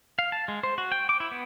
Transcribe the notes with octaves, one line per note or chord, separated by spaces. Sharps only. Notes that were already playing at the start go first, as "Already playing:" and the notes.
F5
A5
G#3
C5
F#4
G5
D6
E4
B3